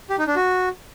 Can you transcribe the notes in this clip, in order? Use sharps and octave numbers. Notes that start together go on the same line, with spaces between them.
G4
D#4
D4
F#4